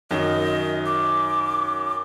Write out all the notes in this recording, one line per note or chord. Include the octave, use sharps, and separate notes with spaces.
F#2 D#3 D#5
D6